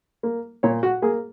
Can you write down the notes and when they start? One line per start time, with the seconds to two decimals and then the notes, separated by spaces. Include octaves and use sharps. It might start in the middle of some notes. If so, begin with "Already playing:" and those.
0.23 A#3
0.63 A#2 C#5
0.83 F#4
1.02 A#3 G#4